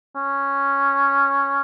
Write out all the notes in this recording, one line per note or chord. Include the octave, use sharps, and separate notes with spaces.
C#4